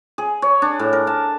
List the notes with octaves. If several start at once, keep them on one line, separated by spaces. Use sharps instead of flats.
G#4
C#5
D4
A2
A#4
A5